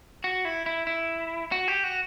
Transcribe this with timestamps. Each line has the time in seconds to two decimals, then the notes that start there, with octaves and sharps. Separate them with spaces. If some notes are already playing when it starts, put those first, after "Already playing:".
0.24 F#4
0.45 E4
0.66 E4
0.87 E4
1.52 F#4
1.68 G4
1.84 F#4